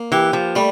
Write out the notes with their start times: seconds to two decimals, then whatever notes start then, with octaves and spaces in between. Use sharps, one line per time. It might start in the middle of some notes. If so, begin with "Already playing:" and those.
Already playing: A#3
0.12 E3 G4
0.33 F3
0.55 G3 A3